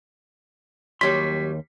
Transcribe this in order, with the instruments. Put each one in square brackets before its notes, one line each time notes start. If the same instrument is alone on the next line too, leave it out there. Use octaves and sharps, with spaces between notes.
[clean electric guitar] D#2 C6 [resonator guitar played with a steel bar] F#3 G3 [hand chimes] B6